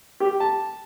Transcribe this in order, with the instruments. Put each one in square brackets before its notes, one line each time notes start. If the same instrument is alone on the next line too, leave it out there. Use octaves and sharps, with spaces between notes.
[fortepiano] G4
A5